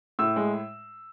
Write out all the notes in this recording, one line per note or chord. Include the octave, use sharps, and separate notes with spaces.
A2 E6
G#3